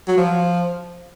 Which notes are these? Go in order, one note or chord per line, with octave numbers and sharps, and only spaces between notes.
F#3
F3